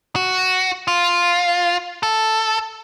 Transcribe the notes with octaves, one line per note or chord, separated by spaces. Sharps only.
F#4
F4
A4